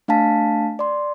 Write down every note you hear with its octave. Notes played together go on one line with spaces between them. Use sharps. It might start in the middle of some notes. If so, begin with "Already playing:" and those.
A3 D4 F5 G#5 A5 B6
D5 C6